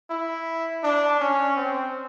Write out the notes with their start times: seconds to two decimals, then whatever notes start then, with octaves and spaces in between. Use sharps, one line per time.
0.10 E4
0.83 D4
1.20 C#4
1.56 C4